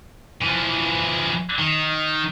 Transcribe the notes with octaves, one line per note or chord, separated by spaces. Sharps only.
E3 F3
D#3